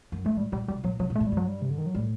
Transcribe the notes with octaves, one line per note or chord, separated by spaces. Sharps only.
F#2
G2 A3
A2 G3
A#2 G3
C3 G3
A#2 F#3
C3 F#3
A#2
A2 A3
G3
G2
F#3
G3
C3
D3
D#3
F#3
A2 G3